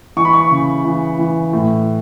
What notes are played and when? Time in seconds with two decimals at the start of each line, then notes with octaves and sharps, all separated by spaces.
0.16 E3 C#6
0.25 B5
0.33 C#6
0.51 C#3
0.85 E3
1.19 E3
1.53 A2